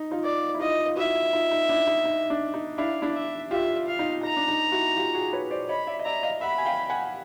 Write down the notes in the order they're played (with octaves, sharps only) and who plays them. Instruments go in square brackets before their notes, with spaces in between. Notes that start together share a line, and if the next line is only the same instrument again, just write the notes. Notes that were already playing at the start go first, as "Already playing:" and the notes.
Already playing: [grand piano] D#4
D#4 F4
[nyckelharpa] D5
[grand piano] E4
[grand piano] D#4 F4 [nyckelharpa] D#5
[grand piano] F4
[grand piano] E4 F#4 [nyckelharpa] E5
[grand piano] D#4 F4
D#4
D4 E4
D#4
D#4
D4
D#4
[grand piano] D4 E4 [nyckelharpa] F5
[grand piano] D4 E4
[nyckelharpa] E5
[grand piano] F4 G4 [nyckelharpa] E5
[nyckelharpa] F5
[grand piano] D#4 F4
[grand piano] D#4 [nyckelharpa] A#5
[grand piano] D4
D#4
E4 F#4
F4 G4
F#4 G#4
B4 C#5
C5 D5
[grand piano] C#5 D#5 [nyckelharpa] B5
[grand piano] D5 E5
D#5
[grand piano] D5 E5 [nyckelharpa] A#5
[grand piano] D#5 F5
[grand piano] E5 F#5 [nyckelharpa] B5
[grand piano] G#5
F5 G5
F#5 G#5